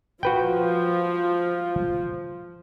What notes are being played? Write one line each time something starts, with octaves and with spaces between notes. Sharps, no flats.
F3 F#4 B4 G5